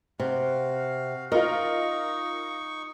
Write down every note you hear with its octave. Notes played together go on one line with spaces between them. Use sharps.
C3 F#4 F5
D#4 F4 A#4 D#5 C#6